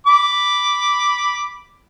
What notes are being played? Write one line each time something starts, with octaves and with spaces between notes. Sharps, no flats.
B5 D6